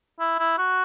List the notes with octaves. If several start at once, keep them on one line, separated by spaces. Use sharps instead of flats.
E4
E4
F#4